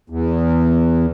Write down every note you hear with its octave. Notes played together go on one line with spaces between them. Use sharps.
E2